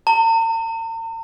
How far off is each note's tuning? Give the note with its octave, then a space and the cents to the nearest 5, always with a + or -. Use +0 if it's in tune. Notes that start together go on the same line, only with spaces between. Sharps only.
A#5 -45